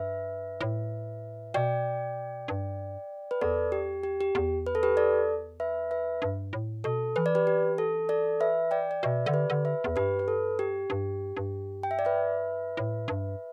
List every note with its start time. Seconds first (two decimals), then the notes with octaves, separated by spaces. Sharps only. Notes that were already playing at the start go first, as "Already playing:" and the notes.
Already playing: G2 B4 E5
0.61 A2
1.54 B2 D5 G5
2.48 G2
3.31 B4
3.41 E2 A4 D5
3.72 G4
4.03 G4
4.21 G4
4.35 E2
4.66 B4
4.75 A4
4.83 G4 B4
4.97 A4 D5
5.60 B4 E5
5.91 B4 E5
6.22 G2
6.53 A2
6.84 B2 A4
7.16 E3 B4
7.26 D5
7.35 G4 B4
7.47 G4
7.78 A4
8.09 A4 D5
8.40 B4 E5
8.71 D5 G5
8.91 D5
9.03 B2 B4 E5
9.26 D3 D5
9.33 G4 B4
9.50 D3
9.65 B4 E5
9.84 E2
9.96 G2 G4 B4
10.19 B4
10.28 A4
10.59 G4
10.90 G2
11.37 G2
11.83 G5
11.91 E5
11.99 D5
12.05 B4 E5
12.77 A2
13.08 G2